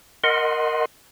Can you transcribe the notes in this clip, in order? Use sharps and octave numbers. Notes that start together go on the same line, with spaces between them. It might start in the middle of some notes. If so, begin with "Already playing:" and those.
A#4 D#5 F#5 C6